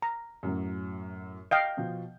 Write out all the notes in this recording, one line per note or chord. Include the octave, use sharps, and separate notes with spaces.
A#5
F#2 A2 F#3
D#5 F5 G5 G6
B2 F3